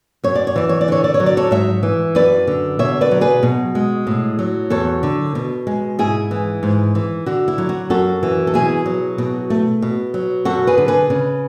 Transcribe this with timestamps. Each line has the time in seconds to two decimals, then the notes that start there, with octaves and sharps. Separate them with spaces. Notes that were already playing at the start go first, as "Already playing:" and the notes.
0.24 F#2 C#5
0.35 D5
0.47 C#5
0.56 E3 D5
0.69 C#5
0.81 D5
0.88 D3 C#5
1.04 D5
1.14 C#5
1.20 F#3
1.26 D5
1.37 A4 C#5
1.51 G#2 C#5 E5
1.83 E3
2.15 F#2 B4 D5
2.47 D3
2.79 B2 C#5 E5
3.01 B4 D5
3.11 F#3
3.21 G#4 B4
3.43 B2
3.75 G#3
4.07 A2
4.39 F#3
4.70 E2 A4 C#5
5.03 D3
5.35 B2
5.67 G#3
5.99 G#2 E4 G#4
6.31 E3
6.63 G#2
6.95 E3
7.26 D3 F#4
7.48 E4
7.58 F#3
7.69 F#4
7.90 F#2 F#4 A4
8.23 E3
8.47 A4
8.54 B2 E4 G#4
8.86 F#3
9.18 B2
9.50 A3
9.82 B2
10.14 F#3
10.45 F#2 F#4 A4
10.67 G#4 B4
10.78 D3
10.88 G#4 B4
11.10 C#3